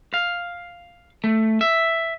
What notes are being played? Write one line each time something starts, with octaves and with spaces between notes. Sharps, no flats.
F5
A3
E5